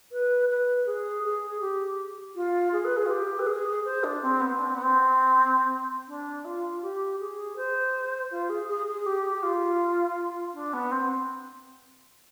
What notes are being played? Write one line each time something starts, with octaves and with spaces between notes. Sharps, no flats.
B4
B4
G#4
G#4
G4
F4
G#4
B4
G#4
F4
G4
B4
G#4
C5
D4
C4
B3
D4
C4
B3
C4
D4
F4
G4
G#4
C5
F4
G#4
G#4
G#4
G4
G4
F4
D4
B3
C4